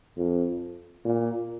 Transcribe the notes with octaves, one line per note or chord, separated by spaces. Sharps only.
F2
A#2